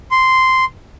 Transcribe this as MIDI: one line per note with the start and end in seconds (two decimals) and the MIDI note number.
0.11 0.65 84